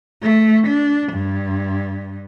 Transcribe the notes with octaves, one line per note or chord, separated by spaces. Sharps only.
A3
D4
G2